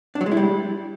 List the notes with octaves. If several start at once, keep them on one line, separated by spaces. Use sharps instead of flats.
D4
F#3
G#3
E4
G3